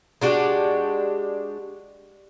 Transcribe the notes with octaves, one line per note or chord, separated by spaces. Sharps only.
G#3 D4 F#4 G4